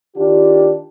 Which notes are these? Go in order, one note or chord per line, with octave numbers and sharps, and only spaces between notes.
D#3 D4 F4 G4